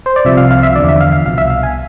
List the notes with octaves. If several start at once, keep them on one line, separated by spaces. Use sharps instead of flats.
C5
D5
C2 C3 F3 E5
F5
F5
E5
E2 D3 F3 D5
E5
F5
F5
C2 B2 F5
E5
F5
G#5